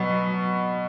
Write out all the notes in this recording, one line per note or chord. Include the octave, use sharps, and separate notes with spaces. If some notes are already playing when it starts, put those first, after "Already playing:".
Already playing: B2 F#3